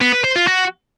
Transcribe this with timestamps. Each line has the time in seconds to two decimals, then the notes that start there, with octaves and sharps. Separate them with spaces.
0.01 B3
0.12 B4
0.24 C5
0.36 F4
0.47 F#4